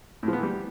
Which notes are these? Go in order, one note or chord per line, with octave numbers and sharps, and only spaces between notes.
A2
F3
B3
E3
G3